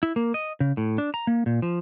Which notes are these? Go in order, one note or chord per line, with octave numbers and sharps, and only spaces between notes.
E4
A#3
D#5
C#3
A2
D4
A#5
A#3
A#2
F3